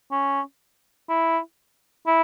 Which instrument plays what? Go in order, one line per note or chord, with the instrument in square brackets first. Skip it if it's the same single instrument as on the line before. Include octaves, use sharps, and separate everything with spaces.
[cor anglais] C#4
E4
E4